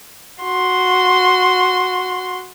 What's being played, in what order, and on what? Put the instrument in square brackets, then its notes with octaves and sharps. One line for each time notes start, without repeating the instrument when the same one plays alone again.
[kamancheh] F#4 C6